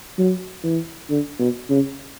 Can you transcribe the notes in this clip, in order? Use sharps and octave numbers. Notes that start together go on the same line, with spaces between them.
F#3
E3
D3
B2
C#3